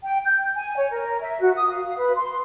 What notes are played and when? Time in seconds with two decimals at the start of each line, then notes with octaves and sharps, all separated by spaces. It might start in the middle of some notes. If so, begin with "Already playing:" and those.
0.03 G5
0.25 G6
0.54 G#5
0.77 C#5
0.91 A#4
1.21 E5
1.41 F#4
1.55 D#6
1.70 F5
1.97 B4
2.16 C6